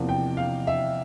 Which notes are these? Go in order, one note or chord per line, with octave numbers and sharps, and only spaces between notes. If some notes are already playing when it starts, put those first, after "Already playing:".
Already playing: E2 C3 F3 A#3
G5
F5
E5